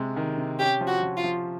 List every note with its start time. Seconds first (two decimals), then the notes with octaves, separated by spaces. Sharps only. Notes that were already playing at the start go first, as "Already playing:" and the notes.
Already playing: C3 G#3
0.16 D#3
0.38 C3
0.59 C#4 G4
0.81 F3
0.88 F#4
1.02 F3
1.17 F4
1.24 F3